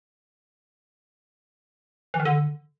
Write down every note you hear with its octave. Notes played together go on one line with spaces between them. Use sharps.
E3
D#3
D3